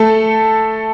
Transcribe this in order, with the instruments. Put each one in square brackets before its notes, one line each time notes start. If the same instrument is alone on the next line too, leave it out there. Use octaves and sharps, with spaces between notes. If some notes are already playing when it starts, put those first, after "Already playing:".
Already playing: [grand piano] A3 A4